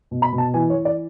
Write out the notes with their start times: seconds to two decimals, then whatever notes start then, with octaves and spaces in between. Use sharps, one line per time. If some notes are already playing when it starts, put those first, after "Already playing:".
0.11 B2
0.22 B5
0.33 B2
0.38 A5
0.54 E3 G#5
0.70 C#5
0.75 E3
0.85 D5